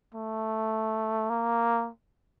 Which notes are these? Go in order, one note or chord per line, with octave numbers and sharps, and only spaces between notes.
A3
A#3